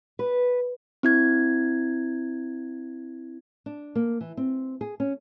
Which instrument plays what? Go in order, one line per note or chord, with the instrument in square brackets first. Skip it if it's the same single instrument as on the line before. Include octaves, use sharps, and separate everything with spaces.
[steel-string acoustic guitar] B4
[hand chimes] C4 E4 G#6
[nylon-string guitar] D4
A#3
E3
C4
G#4
C#4